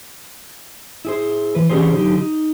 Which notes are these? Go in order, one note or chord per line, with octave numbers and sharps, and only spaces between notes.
E4 G#4 C5
E3 B4
E3 C#4 D4 G4 G#4 C5
D3 F#3 D#4 G4
D#4